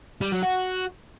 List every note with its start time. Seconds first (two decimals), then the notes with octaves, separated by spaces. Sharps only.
0.21 G3
0.32 F#3
0.43 F#4